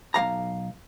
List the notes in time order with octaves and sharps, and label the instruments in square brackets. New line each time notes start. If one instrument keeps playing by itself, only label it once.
[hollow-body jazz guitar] B1 C#3 F5 A#5